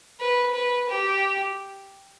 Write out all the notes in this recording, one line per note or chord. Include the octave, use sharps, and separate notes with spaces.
B4
B4
G4